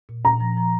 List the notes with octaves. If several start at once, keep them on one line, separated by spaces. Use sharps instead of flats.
A#2
A#2 A#5
F3
F3